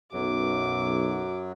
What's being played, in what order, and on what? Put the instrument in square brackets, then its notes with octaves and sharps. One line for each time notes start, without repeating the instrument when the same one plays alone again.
[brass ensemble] B1 [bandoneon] F#2 F#3 [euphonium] F#4 [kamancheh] D6